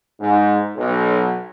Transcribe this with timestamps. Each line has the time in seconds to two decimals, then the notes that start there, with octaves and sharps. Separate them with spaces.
0.19 G#2
0.75 B1